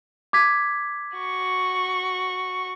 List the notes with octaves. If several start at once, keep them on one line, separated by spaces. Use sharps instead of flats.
D6 G#6 B6
F#4 C#6